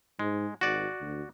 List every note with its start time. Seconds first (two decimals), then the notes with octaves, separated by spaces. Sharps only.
0.19 G#2 G#3
0.61 G#1 F#4 D5
1.01 D2